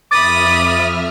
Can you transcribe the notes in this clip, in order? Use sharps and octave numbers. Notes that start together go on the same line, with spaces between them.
F2 E5 B5 D6 D#6 F6 A6